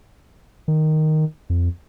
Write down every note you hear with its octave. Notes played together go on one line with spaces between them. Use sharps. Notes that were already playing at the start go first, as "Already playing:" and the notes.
D#3
F2